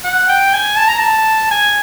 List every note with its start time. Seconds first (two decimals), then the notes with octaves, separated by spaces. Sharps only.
0.04 F#5
0.29 G5
0.53 G#5
0.78 A5
0.88 A#5
0.99 A5
1.51 G#5